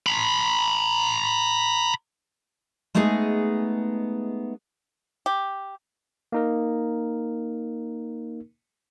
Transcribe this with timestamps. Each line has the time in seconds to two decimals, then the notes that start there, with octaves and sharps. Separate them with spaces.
0.06 A#5 B5
2.95 G#3 A3 B3 D#4 G#4
5.26 G4
6.32 A#3 D#4 A#4